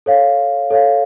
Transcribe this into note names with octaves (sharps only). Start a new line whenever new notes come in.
A4 C#5 F5
A4 C#5 F5